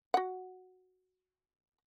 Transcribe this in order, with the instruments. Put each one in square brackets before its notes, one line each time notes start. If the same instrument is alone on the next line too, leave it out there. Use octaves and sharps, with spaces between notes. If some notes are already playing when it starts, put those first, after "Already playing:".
[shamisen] F#4 F#5